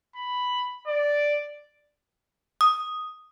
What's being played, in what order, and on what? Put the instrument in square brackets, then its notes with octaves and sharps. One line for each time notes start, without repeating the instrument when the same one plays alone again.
[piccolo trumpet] B5
D5
[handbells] D#6